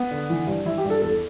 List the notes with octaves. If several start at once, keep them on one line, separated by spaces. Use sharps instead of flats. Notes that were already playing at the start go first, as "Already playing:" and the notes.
Already playing: B3
D3
E3
G2
E3 E4
G4
G2
A4
E2 A4